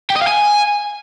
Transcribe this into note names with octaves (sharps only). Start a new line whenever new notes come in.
G4
D#5
F5
G#5